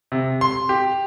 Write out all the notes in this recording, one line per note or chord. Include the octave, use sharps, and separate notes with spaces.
C3
C6
G4